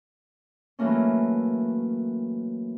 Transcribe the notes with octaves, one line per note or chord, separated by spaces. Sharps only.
E3 F#3 A3 A#3 C#4